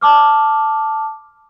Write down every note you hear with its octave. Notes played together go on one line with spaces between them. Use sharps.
A5 D6 F6